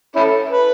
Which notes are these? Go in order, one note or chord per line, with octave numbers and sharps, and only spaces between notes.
C#4 E4 A4
B4